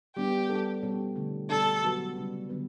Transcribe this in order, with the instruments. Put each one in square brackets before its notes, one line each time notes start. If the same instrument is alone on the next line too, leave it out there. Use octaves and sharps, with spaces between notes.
[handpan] G3 B3 D4 [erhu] G4
[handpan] G3 D4 A4
B2 G3 C#4 G4 C#5
D3 A3 E4
[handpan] B2 G3 B3 D4 G4 [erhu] A4
[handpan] F#3 B3 F#4 B4
C#3 G3 D4
D3 F#3 B3 F#4 B4